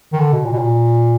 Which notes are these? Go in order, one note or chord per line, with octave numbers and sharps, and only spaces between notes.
D#3
D3
B2
A#2
B2
A#2